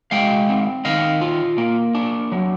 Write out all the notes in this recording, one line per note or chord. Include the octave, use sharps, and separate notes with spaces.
G#3 F5 G5
C4
D#3 D#5 F5
F4
A#3
D4
F#3